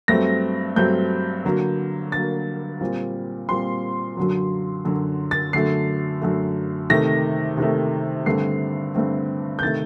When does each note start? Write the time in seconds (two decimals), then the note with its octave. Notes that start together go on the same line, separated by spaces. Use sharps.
0.08 G2 F#3 A3 C4 A#6
0.76 G2 F#3 A3 C4 G6
1.45 D3 F#3 A#3
2.12 D3 F#3 A#3 A6
2.81 A#2 G3 C4
3.49 A#2 G3 C4 C6
4.17 F#2 D3 F#3
4.85 F#2 D3 F#3
5.31 A6
5.53 F#2 D3 A3 C7
6.22 F#2 D3 A3
6.90 C3 D#3 A3 A#6
7.57 C3 D#3 A3
8.26 G2 D3 A3 C4 C7
8.95 G2 D3 A3 C4
9.59 G6
9.62 C3 D#3 A3 A6